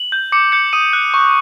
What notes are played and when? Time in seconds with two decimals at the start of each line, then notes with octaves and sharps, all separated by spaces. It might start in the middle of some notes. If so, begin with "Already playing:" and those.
Already playing: F#7
0.12 G6
0.32 D6 C#7
0.52 G6 C#7
0.73 D#6 D#7
0.93 F#6
1.14 C#6